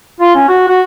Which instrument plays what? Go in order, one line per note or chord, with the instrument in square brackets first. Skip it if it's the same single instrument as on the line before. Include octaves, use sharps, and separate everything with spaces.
[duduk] F4
C#4
F#4
F#4